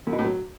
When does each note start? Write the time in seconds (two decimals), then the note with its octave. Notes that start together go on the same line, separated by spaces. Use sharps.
0.07 F#2
0.13 B2
0.19 A2
0.24 F#3